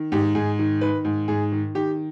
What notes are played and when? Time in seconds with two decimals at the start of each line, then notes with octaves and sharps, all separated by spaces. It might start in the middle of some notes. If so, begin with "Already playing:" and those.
Already playing: D#3
0.12 G#2 G4
0.35 G#2 G#4
0.59 D#3
0.81 D#3 B4
1.05 G#2
1.28 G#2 G#4
1.52 D#3
1.75 D#3 G4